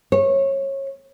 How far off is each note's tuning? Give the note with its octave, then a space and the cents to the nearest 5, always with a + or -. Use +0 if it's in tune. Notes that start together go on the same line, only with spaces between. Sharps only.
C#5 -25